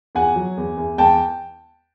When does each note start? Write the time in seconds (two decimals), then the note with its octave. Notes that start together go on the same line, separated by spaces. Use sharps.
0.15 E2 F#5 G#5
0.36 F#3
0.57 E2
0.77 E2
0.98 E2 G5 A5